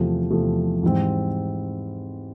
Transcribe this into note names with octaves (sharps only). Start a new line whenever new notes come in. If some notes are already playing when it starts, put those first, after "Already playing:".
Already playing: E2 C3 F3 A3
E2 C3 F3 A3
G#2 E3 G3 C4